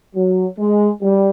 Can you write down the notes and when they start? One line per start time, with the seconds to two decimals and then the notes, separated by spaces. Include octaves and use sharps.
0.15 F#3
0.58 G#3
1.02 G3